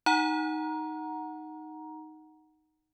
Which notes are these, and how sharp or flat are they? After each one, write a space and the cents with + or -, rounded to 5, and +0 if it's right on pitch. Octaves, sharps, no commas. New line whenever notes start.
D#4 +0 F#5 +0 A#5 +15